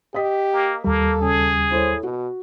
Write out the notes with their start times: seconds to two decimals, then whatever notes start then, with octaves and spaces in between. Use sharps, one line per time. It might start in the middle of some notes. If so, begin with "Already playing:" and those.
0.14 G4 D#5 D#6 B6
0.53 A#3
0.84 D#2 G3 A#3 A4
1.21 C#3 G#4
1.72 E4 A4 C5 C#5
2.03 B2 F#4